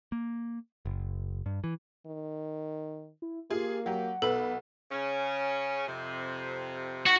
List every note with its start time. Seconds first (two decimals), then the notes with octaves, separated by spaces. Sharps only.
0.12 A#3
0.85 F#1
1.46 G2
1.64 E3
2.06 D#3
3.22 E4
3.50 A#3 F4 G4 G#4
3.86 F#3 G4 F#5
4.22 B1 B3 A4 B4
4.91 C#3 C#4
5.87 F2 C3
7.06 D#3 F#4